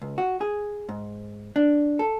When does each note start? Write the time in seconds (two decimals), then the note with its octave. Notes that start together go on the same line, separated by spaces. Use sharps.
0.02 C#2
0.18 F#4
0.41 G#4
0.89 G#2
1.56 D4
1.99 A4